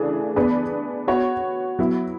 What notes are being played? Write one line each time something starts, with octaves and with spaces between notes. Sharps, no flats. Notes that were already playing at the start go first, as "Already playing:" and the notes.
Already playing: C#3 E3 A3 D4 G#4
B3 D4 G#4 B4
B3 F#4 C#5
F#3 B3 E4